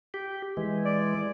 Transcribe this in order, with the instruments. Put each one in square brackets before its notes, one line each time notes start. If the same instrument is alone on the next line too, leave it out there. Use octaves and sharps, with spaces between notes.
[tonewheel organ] G4
E3 G#3
[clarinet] D5